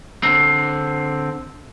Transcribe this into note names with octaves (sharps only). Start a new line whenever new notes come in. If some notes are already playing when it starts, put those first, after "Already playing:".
D3 C4